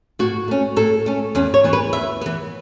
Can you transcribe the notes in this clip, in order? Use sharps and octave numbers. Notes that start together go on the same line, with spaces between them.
A2 F#4
A3 C#4
A2 A4
A3 C#4
E2 C#4
C#5
E3 B3
B4
E2 E5
E3 B3